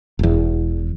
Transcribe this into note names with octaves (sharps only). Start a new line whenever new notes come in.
E1 E2